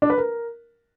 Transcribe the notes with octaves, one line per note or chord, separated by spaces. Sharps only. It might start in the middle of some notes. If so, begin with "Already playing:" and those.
D4
B4
A#4